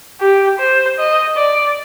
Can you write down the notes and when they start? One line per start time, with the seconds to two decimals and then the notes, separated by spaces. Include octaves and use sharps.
0.21 G4
0.59 C5
0.99 D#5
1.37 D5